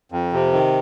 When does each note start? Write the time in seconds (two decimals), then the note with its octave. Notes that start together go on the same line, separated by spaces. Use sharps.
0.12 F2
0.33 C3
0.53 D#3